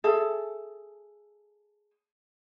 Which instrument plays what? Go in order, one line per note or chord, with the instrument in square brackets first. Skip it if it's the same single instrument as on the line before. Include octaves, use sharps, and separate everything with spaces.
[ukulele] G#4 A4 E5